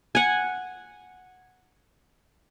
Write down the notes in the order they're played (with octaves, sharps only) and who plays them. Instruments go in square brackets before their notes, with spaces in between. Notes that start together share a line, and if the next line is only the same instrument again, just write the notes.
[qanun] F#5 G#5